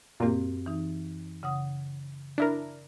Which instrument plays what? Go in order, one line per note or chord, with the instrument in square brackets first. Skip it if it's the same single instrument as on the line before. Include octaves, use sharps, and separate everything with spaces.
[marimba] F#2 C4 G4 [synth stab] A#2 A#3
[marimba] E3 D#4
C#3 F#5 D#6
[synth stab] D4 E4 A#4